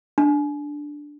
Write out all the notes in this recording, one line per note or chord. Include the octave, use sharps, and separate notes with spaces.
D4